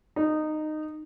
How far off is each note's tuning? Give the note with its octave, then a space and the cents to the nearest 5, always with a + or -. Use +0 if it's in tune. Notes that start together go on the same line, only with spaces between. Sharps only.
D#4 -15